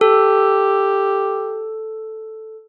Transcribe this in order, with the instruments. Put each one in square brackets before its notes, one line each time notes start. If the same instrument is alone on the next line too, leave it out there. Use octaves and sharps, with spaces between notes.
[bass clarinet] G4 [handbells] A4